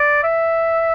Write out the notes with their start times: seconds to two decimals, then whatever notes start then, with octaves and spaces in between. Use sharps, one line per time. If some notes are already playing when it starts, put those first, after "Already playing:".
Already playing: D5
0.24 E5